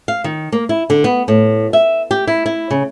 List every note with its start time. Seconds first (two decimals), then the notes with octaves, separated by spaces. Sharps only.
0.08 F5
0.24 D#3
0.52 A#3
0.69 E4
0.90 D3
1.04 B3
1.28 A2
1.73 E5
2.11 G4
2.27 E4
2.46 E4
2.71 C#3